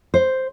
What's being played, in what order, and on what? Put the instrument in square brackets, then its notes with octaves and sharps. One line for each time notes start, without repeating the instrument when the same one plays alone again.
[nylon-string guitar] C5